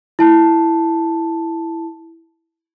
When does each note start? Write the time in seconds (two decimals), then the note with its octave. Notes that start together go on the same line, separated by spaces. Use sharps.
0.19 E4 A5